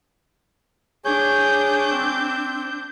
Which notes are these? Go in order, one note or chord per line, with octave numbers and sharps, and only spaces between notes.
D4 G#4 C#5 G6
C4 E6